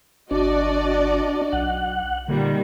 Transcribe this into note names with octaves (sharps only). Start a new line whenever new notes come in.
G1 D4 F#4 D5 D#5
B1 F#5
A#2 D3 D#3 G3